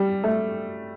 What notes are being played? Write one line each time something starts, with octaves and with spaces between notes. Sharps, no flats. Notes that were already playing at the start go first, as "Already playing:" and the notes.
Already playing: G3
A3